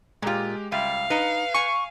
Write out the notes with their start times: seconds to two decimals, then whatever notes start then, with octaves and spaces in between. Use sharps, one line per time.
0.22 A#2 G#3 F4 G4
0.72 C#2 G3 E5 F5
1.10 D#4 B4 C#7
1.54 G#5 C#6